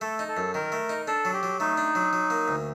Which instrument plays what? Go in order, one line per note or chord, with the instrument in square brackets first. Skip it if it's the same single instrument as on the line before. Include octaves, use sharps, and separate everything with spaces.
[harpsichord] A3 [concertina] A4
[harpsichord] D#4
[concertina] A4
[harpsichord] F#2
[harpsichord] D#3 [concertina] A#4
[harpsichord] A3
D#4
[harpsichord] D4 [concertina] A4
[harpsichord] F#3
[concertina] G4
[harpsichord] F#3
[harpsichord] A3 [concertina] D#4
[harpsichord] D4
F#3
F#3
A#3
D2